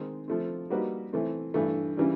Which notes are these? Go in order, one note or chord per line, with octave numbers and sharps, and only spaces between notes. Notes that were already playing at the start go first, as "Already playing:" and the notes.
Already playing: D#3 G#3 C4
F3 A3 C4
G3 A#3 D#4 F#4 B4
E3 A3 C4
G2 E3 A3
C#3 E3 G3